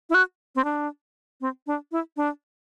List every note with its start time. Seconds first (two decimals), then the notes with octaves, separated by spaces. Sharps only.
0.10 E4
0.14 F#4
0.55 C4
0.64 D4
1.41 C4
1.67 D4
1.92 E4
2.17 D4